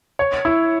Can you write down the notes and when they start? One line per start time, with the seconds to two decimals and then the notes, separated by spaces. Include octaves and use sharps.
0.19 C#5
0.45 E4